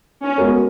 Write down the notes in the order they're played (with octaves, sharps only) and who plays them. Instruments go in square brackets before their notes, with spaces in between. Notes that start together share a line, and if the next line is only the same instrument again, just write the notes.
[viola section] C#4
[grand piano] G#3 B3 F#4 A#4